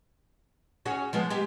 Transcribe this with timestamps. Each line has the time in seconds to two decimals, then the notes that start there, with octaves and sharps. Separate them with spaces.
0.86 C#4 F#4 G#4
1.13 F3 G#3 B3
1.30 G#3 G4